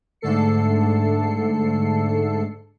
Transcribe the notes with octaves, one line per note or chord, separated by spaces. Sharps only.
G#2 D3 A3 A4 C7 C#7